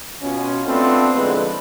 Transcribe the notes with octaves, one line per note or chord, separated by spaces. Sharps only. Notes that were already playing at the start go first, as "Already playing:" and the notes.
B2 C#4 F4
A3 B3 C4 D4 F4 A4
G#2 D3 F3 G#3 E4 B4